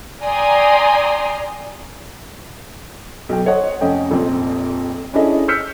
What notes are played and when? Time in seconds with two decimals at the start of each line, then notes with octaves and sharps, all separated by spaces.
0.23 D5 G5 G#5 A#5 C6 D#6
3.29 B1 G5
3.45 C5 C#5 D#5 F#5
3.81 F1 C#4 D#5 G5
4.10 F1 A#1 F2 C4
5.13 C#4 D4 E4 G#4 A4 D#5
5.48 E6 F6 G6 B6 C#7